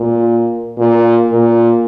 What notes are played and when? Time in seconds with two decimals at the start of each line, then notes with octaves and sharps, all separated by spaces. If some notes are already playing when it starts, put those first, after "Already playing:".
Already playing: A#2
0.78 A#2
1.32 A#2